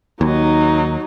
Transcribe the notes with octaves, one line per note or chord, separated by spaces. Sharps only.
D#2 F#3 D#4